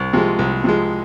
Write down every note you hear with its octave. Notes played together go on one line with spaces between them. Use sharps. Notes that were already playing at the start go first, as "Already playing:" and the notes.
Already playing: C2
C3 F3 G#3
C2
C3 F3 G#3